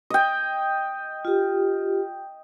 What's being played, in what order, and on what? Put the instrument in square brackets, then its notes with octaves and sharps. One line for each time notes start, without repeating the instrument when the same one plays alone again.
[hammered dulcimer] D#5 G5
[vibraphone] F4 G4